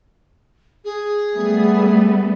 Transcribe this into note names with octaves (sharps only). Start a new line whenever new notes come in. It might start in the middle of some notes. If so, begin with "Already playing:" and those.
G#4
G3 A3 B3